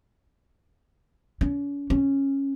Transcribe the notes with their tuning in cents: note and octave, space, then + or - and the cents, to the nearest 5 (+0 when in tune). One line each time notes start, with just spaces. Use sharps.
C#4 +40
C#4 -10